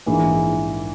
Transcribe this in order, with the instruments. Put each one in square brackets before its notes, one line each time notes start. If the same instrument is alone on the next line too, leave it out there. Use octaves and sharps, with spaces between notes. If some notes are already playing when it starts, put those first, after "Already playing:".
[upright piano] A#1 G#2 E3 A#3